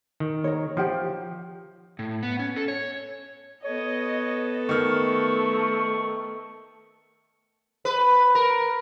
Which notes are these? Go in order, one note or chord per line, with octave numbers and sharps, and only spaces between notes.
D#3
A#4 C#5
F3 F4 G4 G5
A2
B3
C#4
A4
C#5
B3 A4 C#5 D#5
D#3 A3 C#6 F6
B4
A#4